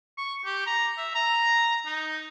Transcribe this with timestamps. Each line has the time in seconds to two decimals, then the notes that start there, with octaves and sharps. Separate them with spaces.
0.17 C#6
0.45 G4
0.66 A#5
0.98 E5
1.15 A#5
1.86 D#4